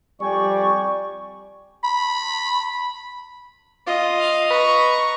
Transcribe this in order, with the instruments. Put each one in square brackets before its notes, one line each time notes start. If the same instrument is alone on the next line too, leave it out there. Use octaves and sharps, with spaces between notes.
[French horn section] F2 G3 D5 [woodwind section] G5 G#5 C#6
[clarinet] B5
[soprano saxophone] F4 [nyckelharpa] D#5
[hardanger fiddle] F5
[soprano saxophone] B4 [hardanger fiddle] A#5 C#6